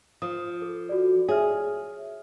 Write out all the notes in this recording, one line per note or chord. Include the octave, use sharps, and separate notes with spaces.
F3 D#6
A4
F#4 A4 D5
G#4 C#5 E5 F6